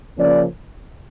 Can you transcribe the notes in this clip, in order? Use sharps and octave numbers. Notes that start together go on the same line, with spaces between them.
C#3 F3 A#3 C#4 D5